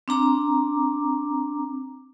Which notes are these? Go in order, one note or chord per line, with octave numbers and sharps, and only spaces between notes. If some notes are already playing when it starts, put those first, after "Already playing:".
C4 D4 A#5 D6